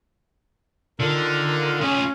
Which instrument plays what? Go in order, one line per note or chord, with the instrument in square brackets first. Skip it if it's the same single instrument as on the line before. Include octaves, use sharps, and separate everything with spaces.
[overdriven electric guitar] D3 [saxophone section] D#3 F4 A#4
[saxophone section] C#4 [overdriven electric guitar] F4 G#4